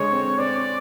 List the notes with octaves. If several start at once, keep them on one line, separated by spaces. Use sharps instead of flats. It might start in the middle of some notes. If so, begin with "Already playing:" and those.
Already playing: D3 G#3 C#5
C4
C4 D5